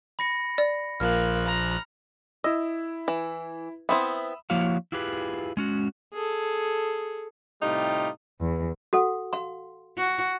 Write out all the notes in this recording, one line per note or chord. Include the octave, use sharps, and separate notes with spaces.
B5 A#6 C#7
D5
A#1 F3 A#3 F6 F#6
A#5
E4 D#5 E6
E3
B3 C4 E4 E5 B5 D#6
F3 A#3 E4 F#4 C#5 F5
E4 F4 G4 G#4 B4
G#3 C#4 F#4
G#4 A4
A2 C3 G3 D#4 F4 G4
E2
F#4 A4 F#5
F5 C6
F#4